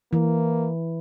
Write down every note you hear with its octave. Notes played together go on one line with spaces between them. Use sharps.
E3 A#3